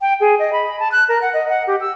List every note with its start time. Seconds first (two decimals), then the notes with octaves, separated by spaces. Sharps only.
0.01 G5
0.20 G#4
0.39 D#5
0.53 B5
0.79 A5
0.92 F#6
1.09 A#4
1.22 F#5
1.34 D#5
1.49 F#5
1.67 G4
1.81 E6